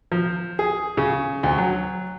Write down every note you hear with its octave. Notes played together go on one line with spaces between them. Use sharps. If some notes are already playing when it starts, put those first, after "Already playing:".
F3
G#4
C#3
D2
F#3